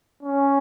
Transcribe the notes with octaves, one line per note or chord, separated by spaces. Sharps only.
C#4